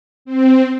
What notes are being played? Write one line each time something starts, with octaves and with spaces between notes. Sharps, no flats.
C4